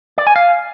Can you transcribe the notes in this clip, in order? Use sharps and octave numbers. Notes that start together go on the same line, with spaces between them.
D5
G#5
F5